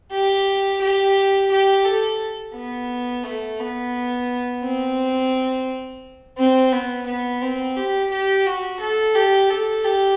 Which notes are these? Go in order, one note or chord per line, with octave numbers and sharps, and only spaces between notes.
G4
G4
G4
A4
B3
A3
B3
C4
C4
B3
B3
C4
G4
G4
F#4
A4
G4
A4
G4